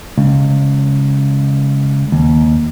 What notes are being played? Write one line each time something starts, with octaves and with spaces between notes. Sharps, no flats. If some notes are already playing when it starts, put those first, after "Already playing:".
C#2
D#2